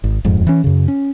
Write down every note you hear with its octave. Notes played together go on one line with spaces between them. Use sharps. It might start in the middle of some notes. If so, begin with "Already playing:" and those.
G#1
D#1 F2 G#2
E3 C#4
F#2 C#3
C#4